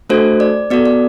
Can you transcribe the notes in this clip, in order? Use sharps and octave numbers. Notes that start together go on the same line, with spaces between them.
A3 D4 F#4 A4 C5
D5
B3 F#4 A4 D5
D5